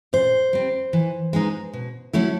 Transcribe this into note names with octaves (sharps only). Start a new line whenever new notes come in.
A#2 C5
G3 C4
E3
G#3 B3 D#4
B2
F#3 A3 C#4 E4